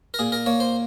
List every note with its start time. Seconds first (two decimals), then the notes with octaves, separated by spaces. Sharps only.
0.14 A#4
0.19 A#2 G#4
0.32 A#4
0.46 A#3 C#5
0.60 C5